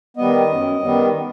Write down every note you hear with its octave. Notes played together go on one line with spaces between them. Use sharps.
D#3 G3 B3 D#5
F#2
D#3 G3 B3